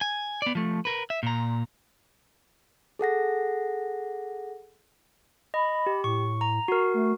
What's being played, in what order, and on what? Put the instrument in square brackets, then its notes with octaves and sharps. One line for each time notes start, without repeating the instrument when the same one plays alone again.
[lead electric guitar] G#5
B3 D5
F3 A3
A#4 B4
E5
A#2 A#5
[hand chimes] G#4 A4 F#5 A#6
[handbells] D#5 [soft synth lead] B5
[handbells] G4
[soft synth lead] A2 [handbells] C#6
[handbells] A#5
F#4 A#4
[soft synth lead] A3